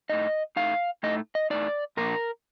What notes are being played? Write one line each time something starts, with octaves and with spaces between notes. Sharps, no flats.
A2 A3 D#4 D#5
A2 A3 D#4 F5
A2 A3 D#4 D#5
D#5
A2 A3 D#4 D5
A#2 F3 A#3 D4 A#4